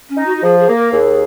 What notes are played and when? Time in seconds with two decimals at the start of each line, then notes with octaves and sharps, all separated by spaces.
0.09 C#4
0.17 D#4
0.26 F#4
0.37 F#4
0.43 F3 G#4
0.59 G#4
0.68 A#3
0.76 A#4
0.93 D#2 G#4